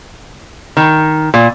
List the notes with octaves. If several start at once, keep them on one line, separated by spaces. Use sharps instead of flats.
D#3
A#2